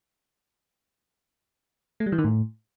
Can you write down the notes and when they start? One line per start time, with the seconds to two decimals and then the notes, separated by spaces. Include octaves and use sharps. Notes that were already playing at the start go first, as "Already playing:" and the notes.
2.00 A3
2.06 G3
2.12 E3
2.18 D#3
2.24 A2